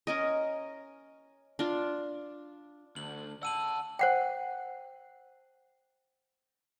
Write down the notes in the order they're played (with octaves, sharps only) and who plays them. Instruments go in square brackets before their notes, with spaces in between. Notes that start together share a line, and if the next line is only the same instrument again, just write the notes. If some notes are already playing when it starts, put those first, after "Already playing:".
[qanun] C#4 A#4 D#5
D4 F4
[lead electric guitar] D2 [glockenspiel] F#7
[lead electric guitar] F#5 A5 [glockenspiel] E6 D#7 F#7
[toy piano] C5 F#5 G5